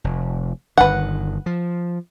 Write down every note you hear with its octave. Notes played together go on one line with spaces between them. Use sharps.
F1
G1 D#3 B4 F#5
F3